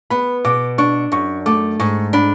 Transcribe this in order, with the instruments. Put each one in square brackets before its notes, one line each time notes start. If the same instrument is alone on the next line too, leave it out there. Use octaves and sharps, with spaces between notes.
[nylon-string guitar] B3 [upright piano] B5
[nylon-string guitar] B2 [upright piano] D6
[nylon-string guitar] D4 [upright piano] C#6
[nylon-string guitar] F#2 [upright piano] C#6
[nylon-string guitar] A3 [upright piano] D6
[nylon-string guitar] G#2 [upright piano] C#6
[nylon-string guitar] D4 [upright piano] B5